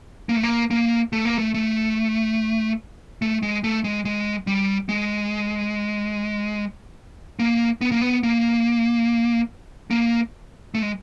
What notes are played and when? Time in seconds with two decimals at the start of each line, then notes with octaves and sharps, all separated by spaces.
0.29 A#3
0.36 A3
0.43 A#3
0.71 A#3
1.13 A3
1.25 A#3
1.38 A3
1.54 A3
3.22 A3
3.43 G#3
3.64 A3
3.84 G#3
4.05 G#3
4.47 G3
4.89 G#3
7.39 A#3
7.81 B3
7.92 A#3
8.01 B3
8.23 A#3
9.90 A#3
10.74 A3
10.82 G#3